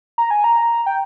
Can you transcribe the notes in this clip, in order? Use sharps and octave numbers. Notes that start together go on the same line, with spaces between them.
A#5
G#5
A#5
G5